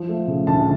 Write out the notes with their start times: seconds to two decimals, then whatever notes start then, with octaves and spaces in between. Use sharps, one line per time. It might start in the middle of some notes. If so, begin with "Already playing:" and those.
Already playing: F3
0.09 A3
0.27 C#3
0.47 D2 A5